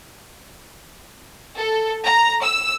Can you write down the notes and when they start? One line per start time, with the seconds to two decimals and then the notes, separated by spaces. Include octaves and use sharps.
1.57 A4
2.05 A#5
2.43 E6